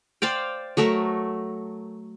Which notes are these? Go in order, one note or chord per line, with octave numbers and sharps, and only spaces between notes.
C5 D5 F5 G5
F#3 A3 A4 A#4